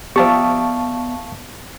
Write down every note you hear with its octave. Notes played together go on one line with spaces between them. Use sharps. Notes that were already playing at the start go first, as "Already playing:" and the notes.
F3 B3 G4 D5 E5 F5 A5 C#6